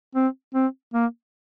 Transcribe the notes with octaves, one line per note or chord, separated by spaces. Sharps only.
C4
C4
A#3